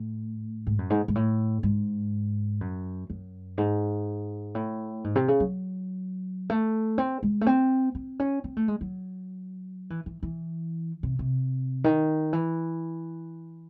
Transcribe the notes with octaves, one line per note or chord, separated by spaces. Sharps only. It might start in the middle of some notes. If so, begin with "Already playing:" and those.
Already playing: A2
G#2
F#2
G#2
G#2
A2
G#2
F#2
F#2
G#2
A2
G#2
C3
C#3
F#3
A3
C4
G#3
A3
C4
C4
C#4
C4
A3
G#3
F#3
E3
E3
E3
C3
C3
D#3
E3